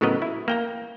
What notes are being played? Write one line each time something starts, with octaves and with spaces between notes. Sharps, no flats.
A2 C#3 F#3 B3 A#4 D#5
E4
A#3 G5 A#5